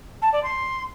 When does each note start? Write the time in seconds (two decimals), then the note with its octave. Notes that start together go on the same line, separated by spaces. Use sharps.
0.22 A5
0.32 D5
0.43 C6